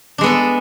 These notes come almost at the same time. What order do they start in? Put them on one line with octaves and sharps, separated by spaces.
D4 G#3 B3 A4